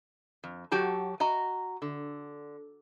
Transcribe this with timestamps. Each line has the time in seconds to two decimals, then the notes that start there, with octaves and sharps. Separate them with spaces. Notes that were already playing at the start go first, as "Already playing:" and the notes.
0.44 F2
0.72 F#3 F#4 G4 A5
1.20 F#4 D#5 A#5
1.82 D3